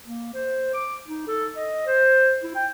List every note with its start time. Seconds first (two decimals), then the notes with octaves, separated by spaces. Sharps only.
0.07 A#3
0.34 C5
0.74 D6
1.08 D#4
1.28 A4
1.56 D#5
1.86 C5
2.43 E4
2.55 G5